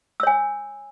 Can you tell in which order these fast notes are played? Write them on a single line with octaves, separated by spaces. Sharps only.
E6 C#5 G#5